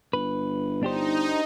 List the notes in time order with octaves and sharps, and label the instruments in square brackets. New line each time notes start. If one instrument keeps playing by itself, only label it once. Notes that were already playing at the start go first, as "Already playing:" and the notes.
[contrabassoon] G1 [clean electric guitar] B4
[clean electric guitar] D4 G4 C5 [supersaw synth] D#4